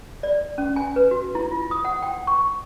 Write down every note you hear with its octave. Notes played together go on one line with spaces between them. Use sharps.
D5
C#4
G#5
B4
F#4
E4
F4
D#6
F#5
G5
C#6